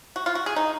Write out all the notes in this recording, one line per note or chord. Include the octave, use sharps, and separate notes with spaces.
F#4
F4
F#4
G#4
D#4